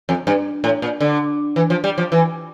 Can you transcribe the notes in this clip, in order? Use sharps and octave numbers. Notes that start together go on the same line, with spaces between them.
F2
G2
A2
A#2
D3
E3
F3
G3
F3
E3